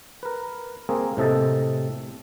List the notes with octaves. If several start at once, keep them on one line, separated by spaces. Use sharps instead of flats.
A#4 B4
A#3 C4 G#4 A#4
A2 C3 A4 D#5 A5